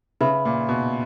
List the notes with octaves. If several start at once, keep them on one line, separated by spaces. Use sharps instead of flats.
C#3 B4 E5 B5
A#2
B2